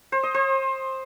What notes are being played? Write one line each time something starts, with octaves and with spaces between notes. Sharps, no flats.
C5
D#5
C5